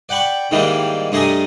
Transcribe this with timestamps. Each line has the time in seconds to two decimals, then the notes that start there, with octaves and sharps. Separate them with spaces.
0.09 D5 F#5 G5 B5 C#6
0.51 G#2 D#3 E3 G3 G#3 A#3
1.12 G2 A3 G#4 D#5 G#5 A#5